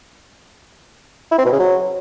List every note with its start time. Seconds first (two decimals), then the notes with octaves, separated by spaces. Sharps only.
1.31 E4
1.38 C4
1.45 B2
1.52 C#3
1.59 F#3